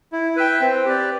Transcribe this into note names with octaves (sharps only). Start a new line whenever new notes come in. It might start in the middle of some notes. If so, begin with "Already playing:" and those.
E4
B4 E5 G5
C4
G4 B4 D5